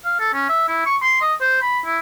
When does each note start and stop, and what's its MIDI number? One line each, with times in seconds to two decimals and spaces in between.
0.05 0.17 77
0.19 0.33 69
0.34 0.47 61
0.49 0.67 76
0.68 0.85 64
0.86 0.96 85
1.02 1.17 84
1.21 1.34 75
1.41 1.61 72
1.62 1.80 83
1.86 2.00 64